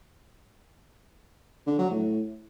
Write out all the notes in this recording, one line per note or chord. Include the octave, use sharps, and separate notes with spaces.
D3
F#3
A2